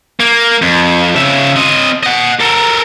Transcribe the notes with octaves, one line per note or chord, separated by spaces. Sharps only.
A#3
F2
C#3 E5
C4 D#5
D#5 F#5
A4 A#4